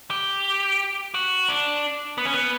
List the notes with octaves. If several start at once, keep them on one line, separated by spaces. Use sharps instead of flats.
G4
F#4
D4
B3
C#4
B3